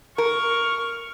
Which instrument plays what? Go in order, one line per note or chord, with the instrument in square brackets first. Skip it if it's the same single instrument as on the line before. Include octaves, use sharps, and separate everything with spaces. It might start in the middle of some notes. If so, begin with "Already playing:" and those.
[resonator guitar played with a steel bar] A#4 [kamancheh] C#6 [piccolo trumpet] F6